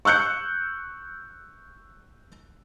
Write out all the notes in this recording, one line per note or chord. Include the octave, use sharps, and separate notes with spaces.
C#6 E6 F#6 G6 C#7